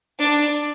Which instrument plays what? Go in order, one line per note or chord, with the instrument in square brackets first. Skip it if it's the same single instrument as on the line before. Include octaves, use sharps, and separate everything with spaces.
[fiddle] D4